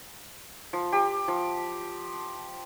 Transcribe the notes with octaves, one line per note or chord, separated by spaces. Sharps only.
F3
G4
F3